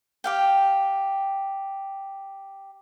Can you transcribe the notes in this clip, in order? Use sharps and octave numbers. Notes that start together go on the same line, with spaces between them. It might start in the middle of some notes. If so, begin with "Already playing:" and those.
G4 F5 G5